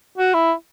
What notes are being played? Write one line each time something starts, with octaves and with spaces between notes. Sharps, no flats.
F#4
E4